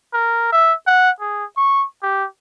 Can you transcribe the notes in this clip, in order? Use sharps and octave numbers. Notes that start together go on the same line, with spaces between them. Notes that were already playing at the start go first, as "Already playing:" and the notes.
A#4
E5
F#5
G#4
C#6
G4